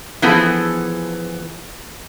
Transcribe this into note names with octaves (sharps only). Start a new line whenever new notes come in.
E3 F3 B3 G#4 A4